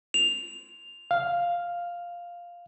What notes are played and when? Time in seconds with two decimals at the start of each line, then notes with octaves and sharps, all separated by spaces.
0.14 F7
1.11 F5